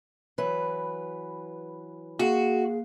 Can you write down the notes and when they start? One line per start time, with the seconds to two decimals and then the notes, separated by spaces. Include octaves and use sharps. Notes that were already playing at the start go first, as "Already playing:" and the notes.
0.38 E3 F#3 B4
2.20 A#3 F#4 G#4 F5 C7